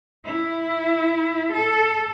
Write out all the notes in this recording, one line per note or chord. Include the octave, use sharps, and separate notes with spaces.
E4
A4